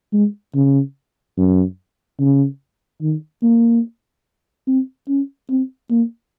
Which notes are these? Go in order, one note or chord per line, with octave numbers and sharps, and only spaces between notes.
G#3
C#3
F#2
C#3
D#3
A#3
C4
C#4
C4
A#3